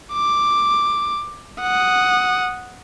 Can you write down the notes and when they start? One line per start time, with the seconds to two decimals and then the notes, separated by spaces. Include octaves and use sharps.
0.14 D6
1.61 F#5 D#6